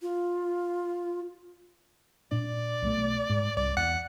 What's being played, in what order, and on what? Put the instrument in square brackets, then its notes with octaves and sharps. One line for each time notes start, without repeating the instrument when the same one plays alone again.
[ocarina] F4
[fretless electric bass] A#2 D4 [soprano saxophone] D5
[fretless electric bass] B1 G3 A3
G#2
[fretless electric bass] C2 [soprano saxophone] D5
[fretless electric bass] E2 [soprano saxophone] F#5